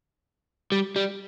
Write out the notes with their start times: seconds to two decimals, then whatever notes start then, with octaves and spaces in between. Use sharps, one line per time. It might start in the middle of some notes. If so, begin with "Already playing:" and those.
0.72 G3
0.96 G3